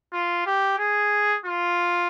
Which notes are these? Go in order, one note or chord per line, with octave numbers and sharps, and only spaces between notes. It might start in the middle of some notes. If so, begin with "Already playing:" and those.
F4
G4
G#4
F4